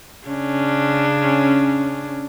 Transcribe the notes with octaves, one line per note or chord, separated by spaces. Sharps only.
C#3 C#4 D4